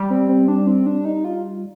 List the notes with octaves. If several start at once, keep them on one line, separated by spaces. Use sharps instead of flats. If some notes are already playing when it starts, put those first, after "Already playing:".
Already playing: G3
C4
C4
D4
C4
D4
D#4
F4